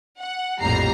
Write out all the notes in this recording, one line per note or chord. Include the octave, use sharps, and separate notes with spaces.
F#5
A#1 F2 A2 G3 A#5 C7